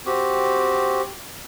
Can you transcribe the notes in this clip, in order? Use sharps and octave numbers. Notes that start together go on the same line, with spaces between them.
C4 F#4 G4